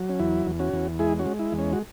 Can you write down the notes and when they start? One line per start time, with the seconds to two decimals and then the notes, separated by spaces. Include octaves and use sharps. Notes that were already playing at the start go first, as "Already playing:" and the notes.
Already playing: F#3
0.09 C#4
0.19 E2 E4
0.46 E2
0.59 C#4 F#4
0.73 E2
0.99 G#3 E4 G#4
1.19 C#4 F#4
1.26 G#3
1.39 E4
1.53 E2
1.59 C#4
1.73 F#4